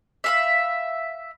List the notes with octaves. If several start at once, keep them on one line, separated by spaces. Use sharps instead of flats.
E5 F5 B5